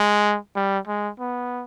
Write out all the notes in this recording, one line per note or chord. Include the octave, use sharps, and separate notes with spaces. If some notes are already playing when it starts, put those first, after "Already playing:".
Already playing: G#3
G3
G#3
B3